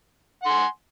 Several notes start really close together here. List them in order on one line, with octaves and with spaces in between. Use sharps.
F#5 C6 G#5